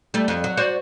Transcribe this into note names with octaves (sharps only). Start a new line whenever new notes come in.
G3 A3
F2
F#3
F#4 C5 D5